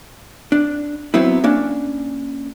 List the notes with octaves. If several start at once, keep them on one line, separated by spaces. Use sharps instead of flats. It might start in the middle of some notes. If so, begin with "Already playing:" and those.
D4
F#3 B3 C4 E4
A#3 C#4 D4